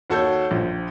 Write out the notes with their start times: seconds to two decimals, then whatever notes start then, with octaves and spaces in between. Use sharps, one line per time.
0.10 D#2 F#4 A4 C#5 G6
0.51 A#1 F3